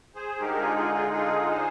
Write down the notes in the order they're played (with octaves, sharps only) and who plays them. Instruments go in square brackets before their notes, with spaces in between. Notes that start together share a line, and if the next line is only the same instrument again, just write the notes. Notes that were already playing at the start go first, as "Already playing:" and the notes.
[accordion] G#4 C5
D3 G#3 D#4 G4 A#4
F4 G#4
F4 G#4
F4 G#4
F4 G#4
G#4 C5